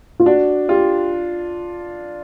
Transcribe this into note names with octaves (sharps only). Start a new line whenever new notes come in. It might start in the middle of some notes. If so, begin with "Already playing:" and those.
F4
D4 F#4
F4 G4